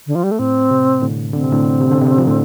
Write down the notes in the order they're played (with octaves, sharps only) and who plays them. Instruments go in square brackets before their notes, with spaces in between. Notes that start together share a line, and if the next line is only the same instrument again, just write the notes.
[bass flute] D3
F3
G3
A3
[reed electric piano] A2 [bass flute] C4
[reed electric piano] C3
A2 D3
[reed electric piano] D3 [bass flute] C4
[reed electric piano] C3
A2 D3
C3
D3
C3
F3
A2 D3